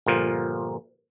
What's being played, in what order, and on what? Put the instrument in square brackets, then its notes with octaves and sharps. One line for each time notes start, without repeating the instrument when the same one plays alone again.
[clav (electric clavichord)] G1 A#2 F3